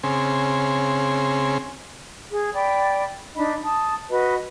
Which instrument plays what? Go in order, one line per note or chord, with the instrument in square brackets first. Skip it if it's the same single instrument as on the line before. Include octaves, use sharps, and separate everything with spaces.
[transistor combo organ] C#3 C4 G#4
[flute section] G#4
D5 G5 B5
D4 D#4 D#5 B5
A5 D#6
F#4 B4 D#5